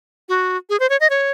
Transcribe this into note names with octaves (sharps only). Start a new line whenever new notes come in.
F#4
G#4
C5
C#5
D#5
C#5